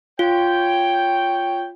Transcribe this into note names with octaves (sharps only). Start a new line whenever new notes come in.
F4 C#5 G5